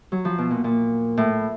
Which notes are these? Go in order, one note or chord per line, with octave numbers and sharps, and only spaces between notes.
F#3
F3
B2
A#2
A#2
A2